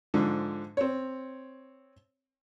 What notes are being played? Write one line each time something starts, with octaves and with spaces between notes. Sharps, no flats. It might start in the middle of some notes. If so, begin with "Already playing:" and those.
G#2 D3 F3
C4 C#5